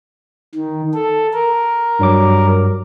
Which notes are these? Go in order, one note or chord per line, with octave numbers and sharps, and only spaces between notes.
D#3
A4
A#4
G2 F#3 D6